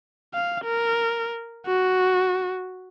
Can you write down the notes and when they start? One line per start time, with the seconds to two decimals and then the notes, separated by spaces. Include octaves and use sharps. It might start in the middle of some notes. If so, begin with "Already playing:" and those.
0.34 F5
0.64 A#4
1.66 F#4